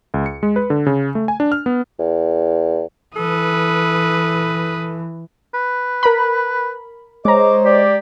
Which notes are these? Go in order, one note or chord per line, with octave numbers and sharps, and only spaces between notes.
C#2
C#7
G#3
B4
D3
C#3
A3
G#5
D4
F6
B3
E2
E3 A4 B4 D#6
B4
A#4 B5
G#3 C5 C#5 D#5 A#5 D6
G4 D5